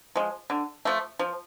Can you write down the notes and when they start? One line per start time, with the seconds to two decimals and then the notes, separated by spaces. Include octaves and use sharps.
0.16 F3 G#3
0.50 D3
0.85 F3 A3
1.19 F3